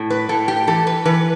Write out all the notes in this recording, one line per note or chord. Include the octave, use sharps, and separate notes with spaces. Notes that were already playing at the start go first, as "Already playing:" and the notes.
Already playing: A2
B4
A2 A4
G4
E3 A4
B4
E3 B4